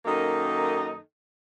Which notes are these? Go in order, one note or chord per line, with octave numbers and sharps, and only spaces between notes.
F#2 D#3 A#3 D#4 A4 D#5